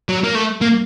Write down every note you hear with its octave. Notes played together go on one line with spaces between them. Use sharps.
F#3
A#3
A3
A#3